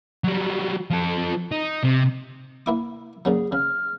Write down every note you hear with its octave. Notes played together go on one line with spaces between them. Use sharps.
F#3 G3
F3 A4
D#4
C3
A#3 E4 D6
A#2 C#3 F#3 G#4
C#3 F6